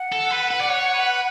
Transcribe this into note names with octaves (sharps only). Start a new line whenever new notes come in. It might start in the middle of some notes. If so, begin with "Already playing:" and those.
Already playing: F#5
A4
B4
B4
D5
C#5
B4